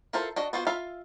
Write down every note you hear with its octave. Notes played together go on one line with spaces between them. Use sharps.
E4 F4 A4 A#4 C5
D4 F#4 D#5
B3 F4 F#4 C5
F4 E5 F5 B5